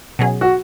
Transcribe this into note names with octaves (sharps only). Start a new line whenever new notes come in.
B2 F#3 C#4 G#4
F#4